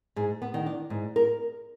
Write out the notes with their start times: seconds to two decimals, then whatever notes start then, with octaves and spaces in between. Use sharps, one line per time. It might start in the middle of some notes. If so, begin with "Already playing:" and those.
0.16 G#2 G#4
0.42 B3
0.54 D#3
0.66 D4
0.90 G#2
1.16 A#4